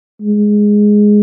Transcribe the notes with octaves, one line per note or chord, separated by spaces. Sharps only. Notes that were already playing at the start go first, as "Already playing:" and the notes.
G#3